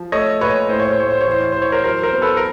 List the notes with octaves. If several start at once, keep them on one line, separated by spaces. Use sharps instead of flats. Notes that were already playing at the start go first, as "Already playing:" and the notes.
Already playing: F3
A3 C#5 D#5
A#2 B4 C#5
A2 C5
C#5
C5
A2 C#5
C5
C#5
E3
C5
C#5
E3 C5
C#5
A#4 C5
F#3 A#4 C5
A#4 C5
B3
A4 B4
A#4